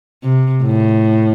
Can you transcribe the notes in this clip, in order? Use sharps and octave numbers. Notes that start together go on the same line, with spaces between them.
C3
A2